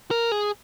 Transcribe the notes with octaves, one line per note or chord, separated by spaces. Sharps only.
A#4
G#4